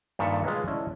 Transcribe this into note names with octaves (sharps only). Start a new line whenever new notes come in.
G2 A#2 D#3 A4 E5 F#5
G#3 F4 G#4 B4 C#5 D#5
C#4 E4 D5 D#5 A5